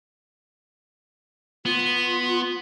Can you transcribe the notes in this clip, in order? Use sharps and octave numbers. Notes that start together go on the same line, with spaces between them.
B3 F4